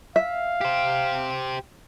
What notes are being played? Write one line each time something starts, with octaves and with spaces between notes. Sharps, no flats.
E5 F5
G4 C5